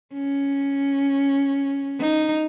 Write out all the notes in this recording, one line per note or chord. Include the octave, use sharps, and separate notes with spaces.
C#4
D#4